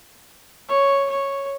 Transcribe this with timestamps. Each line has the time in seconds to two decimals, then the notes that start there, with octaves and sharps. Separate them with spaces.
0.69 C#5
1.10 C#5